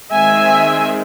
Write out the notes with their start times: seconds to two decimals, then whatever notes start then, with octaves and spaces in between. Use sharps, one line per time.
0.14 D#3 G#3 C4 E5 G#5